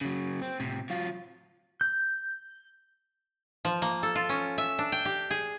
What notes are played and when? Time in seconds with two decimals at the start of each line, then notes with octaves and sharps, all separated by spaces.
0.01 C#3 F#3
0.41 C4
0.60 A2 C3
0.90 F#3 F4
1.81 G6
3.65 F3
3.82 A#3
4.03 A4
4.15 F4
4.29 C#4
4.58 E5
4.79 D4
4.92 G5
5.05 G4
5.30 G#4